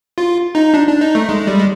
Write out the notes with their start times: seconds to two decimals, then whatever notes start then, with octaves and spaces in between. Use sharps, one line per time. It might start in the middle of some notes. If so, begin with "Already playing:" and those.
0.18 F4
0.55 D#4
0.74 D4
0.88 D4
1.01 D#4
1.15 A3
1.29 G#3
1.47 G3
1.59 G#3